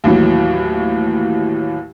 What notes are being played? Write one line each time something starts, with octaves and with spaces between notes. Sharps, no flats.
D#2 A2 E3 F#3